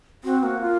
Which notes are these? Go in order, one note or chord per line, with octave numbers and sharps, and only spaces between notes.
C4 F#4
A#3 F#4
F4